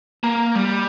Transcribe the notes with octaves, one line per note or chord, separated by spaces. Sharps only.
A#3
G3